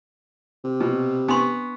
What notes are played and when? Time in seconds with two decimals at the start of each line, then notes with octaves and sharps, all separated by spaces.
0.64 C3
0.80 B2
1.28 B3 D4 C6 C#6